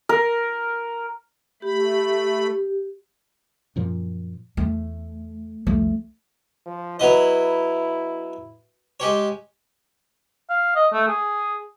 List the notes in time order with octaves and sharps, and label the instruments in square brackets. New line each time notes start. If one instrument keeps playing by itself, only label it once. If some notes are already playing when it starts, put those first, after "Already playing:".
[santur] A#4
[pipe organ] A3 B5 [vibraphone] G4
[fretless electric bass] F#2 A#2 F3
[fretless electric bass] E2 [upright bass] A3
[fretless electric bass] C2 F2 F3 [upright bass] A3
[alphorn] F3
[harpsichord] F#3 B3 D#5 [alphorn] E4
[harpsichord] G#3 G4 C#5
[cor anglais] F5
D#5
A3
G#4